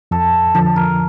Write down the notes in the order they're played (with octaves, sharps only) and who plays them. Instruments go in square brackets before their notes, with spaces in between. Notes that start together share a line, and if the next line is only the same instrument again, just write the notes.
[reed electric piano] F2 [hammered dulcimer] A4
[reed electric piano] D3 F3 [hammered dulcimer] A4
[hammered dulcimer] A#4